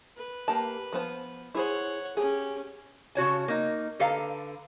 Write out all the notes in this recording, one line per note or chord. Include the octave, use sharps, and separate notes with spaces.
B4
A#3 G4 A5
F3 B3 C5
E4 G#4 C5 C#5 F#5
C#4 G4 G#4
C#3 F#4 C#5 A5
A#3 D#4
D3 A4 B4 F5 A#5